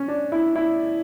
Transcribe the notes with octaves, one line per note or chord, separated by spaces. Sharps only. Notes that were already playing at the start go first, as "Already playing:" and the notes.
Already playing: C#4
D4
E4
E4